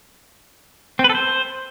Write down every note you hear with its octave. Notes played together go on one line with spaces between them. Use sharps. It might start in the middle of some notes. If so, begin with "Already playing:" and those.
C4
B4
A4
C5